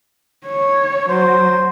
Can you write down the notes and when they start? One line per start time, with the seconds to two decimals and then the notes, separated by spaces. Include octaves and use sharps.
0.46 C#5
1.09 F#3 C5